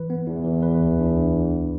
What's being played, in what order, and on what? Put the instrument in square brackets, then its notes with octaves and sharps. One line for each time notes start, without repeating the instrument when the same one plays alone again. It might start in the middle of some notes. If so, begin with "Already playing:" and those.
Already playing: [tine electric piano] E3 B4
B3
[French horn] E2 [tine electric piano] E4
[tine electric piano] E3
B4
D2
D4